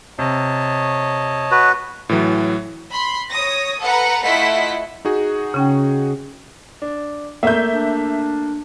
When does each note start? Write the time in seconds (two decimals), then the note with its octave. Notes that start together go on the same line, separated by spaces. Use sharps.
0.19 C3 C#5 D#5 A5
1.51 F#4 B4
2.09 A2 E3 F#3
2.92 B5 C6
3.30 C#5 D#6 A#6
3.82 A4 B4 F#5 A#5
4.23 A3 E4 F4 D#5 F#5 B6
5.05 D#4 F#4 G#4
5.54 C#3 C#4 G5
6.82 D4
7.43 A3 A#3 E5 G6
7.72 D4